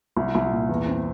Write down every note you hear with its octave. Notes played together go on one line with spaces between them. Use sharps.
C2
C2
A#2
E2
C4